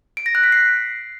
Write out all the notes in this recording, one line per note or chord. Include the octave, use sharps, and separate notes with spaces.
D7
A#6
F#6
B6
C7